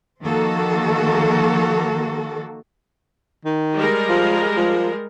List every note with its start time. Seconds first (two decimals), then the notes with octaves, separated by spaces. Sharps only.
0.22 D#3 F3 A#3 F#4 A4
3.45 D#3
3.75 G3 G#3 A#4
4.09 F3
4.57 F3